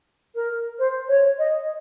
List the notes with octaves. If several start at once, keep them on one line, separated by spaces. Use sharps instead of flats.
A#4
C5
C#5
D#5